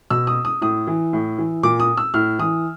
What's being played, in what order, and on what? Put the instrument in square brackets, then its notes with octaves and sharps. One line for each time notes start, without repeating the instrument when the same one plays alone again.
[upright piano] B2 E6
D#6
D#6
A2 D#6
E3
A2
E3
A#2 D6
D#6
E6
A2 F6
E3 D#6